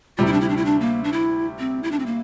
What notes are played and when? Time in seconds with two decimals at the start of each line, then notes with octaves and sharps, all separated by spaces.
0.18 D2 C3 G3 F4
0.26 E4
0.33 D4
0.41 E4
0.49 D4
0.57 E4
0.65 D4
0.81 A#3
1.04 D4
1.12 E4
1.59 C4
1.83 E4
1.92 D4
1.99 C4
2.06 A#3